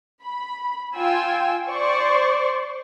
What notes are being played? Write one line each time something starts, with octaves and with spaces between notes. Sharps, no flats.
B5
F4 G5 G#5 E6
C5 D5 C6 C#6